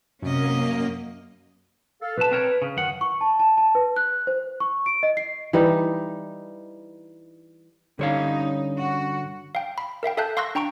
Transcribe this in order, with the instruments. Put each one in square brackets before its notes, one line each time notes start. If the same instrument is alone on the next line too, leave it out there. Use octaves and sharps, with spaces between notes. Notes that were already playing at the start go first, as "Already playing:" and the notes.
[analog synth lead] F#2 [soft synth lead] C3 [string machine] A#3 [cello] C#4 D#5
[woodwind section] A4 F5
[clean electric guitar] B1 A5 [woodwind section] B4
[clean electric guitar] C4 A#4 C#5
C#3
[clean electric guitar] F#2 F#5 [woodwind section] D#3
[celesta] C#6
A5
A5
A5
B4
F#6
C5
C#6
D7
D#5
C7
[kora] E3 G3 D#4
[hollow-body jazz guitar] G2 C#5 F5 [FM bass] D3 [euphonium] C#4 [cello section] D#4
[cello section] F#4
[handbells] F5 G5
B5
A#4 E5 F5 G5
A4 E5 F5 A5 F#6 G6
F5 C6 C#6 E6 F#6 A#6
D4 G5 A#5 C#6 D7